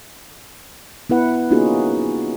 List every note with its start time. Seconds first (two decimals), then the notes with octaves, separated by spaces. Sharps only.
1.10 B3 E4 B4 F#5
1.51 A#3 C#4 D#4 F4 F#4 G#4